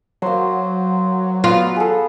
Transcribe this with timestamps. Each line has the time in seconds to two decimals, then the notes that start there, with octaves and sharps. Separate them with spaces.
0.22 F#3 A#3 C5
1.44 B3 F4 B4
1.76 G#4 A4